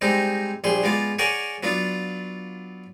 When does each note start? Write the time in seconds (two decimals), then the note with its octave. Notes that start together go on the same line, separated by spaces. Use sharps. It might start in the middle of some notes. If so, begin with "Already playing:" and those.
0.01 G3 G#3 C4 D#4
0.64 A#1 G3 G#4 C6
0.83 G#3 B3 F4 D5
1.19 G#4 A#4 C#5 D5 F#5 G#5
1.63 F#3 B3 D4 F4